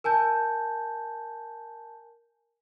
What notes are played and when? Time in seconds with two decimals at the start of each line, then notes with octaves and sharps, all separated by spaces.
0.04 A#4 G#5 A5 G6